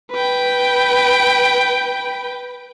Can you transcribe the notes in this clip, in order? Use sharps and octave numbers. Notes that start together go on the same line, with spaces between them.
B4 G5